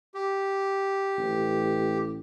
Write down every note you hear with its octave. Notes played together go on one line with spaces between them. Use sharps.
G4
A1